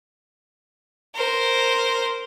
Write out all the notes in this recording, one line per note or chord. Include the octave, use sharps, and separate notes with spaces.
A#4 C5